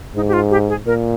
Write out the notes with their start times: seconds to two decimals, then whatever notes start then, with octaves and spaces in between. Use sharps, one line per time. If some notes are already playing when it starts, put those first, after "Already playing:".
0.15 G#2 D#4
0.28 G4
0.33 F4
0.51 G4
0.69 G#4
0.86 A#2 A#4